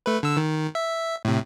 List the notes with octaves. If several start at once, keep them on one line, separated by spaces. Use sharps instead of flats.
A3 B4
D3 E6
D#3
E5
A2 C3